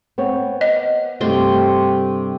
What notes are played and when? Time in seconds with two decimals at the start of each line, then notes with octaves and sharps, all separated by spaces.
0.18 B3 C4 C#5
0.61 D#5
1.21 G2 C3 A3 C6